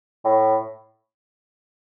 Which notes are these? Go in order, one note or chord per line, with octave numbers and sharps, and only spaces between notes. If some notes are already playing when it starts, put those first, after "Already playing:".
A2